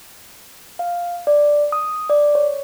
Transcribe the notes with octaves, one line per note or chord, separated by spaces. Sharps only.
F5
D5
D#6
D5
C#5